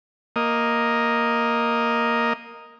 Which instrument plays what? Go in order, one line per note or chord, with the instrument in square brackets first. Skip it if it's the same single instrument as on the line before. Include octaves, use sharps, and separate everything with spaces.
[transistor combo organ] A#3 D#5